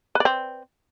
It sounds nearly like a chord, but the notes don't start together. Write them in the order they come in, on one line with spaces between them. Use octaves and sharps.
B4 D5 C4